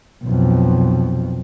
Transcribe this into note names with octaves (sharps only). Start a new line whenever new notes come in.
B1 F2